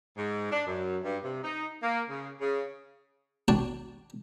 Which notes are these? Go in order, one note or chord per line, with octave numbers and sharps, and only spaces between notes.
G#2
D4
F#2
G2
C3
D#4
A#3
C#3
C#3
D4 F#4 C#5 G5 A5